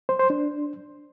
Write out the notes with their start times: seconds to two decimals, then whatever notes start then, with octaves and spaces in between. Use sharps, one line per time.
0.09 C5
0.19 C5
0.30 D4